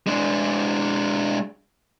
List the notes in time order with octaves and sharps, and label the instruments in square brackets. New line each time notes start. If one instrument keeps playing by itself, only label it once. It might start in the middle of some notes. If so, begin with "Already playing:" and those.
[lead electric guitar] G#3 D4